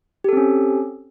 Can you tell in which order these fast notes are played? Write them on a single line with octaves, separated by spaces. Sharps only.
G4 A4 C4 C#4